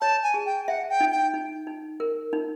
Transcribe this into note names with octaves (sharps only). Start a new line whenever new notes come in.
C#5 A5
G#5
G#4
G5
E5 F#5
G5
D#4
G5
D#4
D#4
A#4
D#4